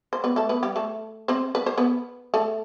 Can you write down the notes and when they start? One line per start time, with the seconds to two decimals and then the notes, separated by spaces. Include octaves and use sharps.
0.13 C5
0.24 B3 B4
0.36 A3 A4
0.49 B3 B4
0.63 G3 G4
0.76 A3 A4
1.28 C4 C5
1.55 B4
1.66 C5
1.78 B3 B4
2.34 A3 A4